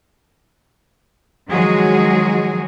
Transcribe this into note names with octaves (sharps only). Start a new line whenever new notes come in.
D#3 F3 F#3 G#3 F#4 G#4